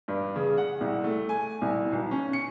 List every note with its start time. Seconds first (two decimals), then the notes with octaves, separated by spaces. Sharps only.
0.08 G2
0.36 C#3
0.57 F#5
0.81 C2
1.04 A3
1.29 G#5
1.61 C2
1.92 B1
2.11 C#4
2.33 C#7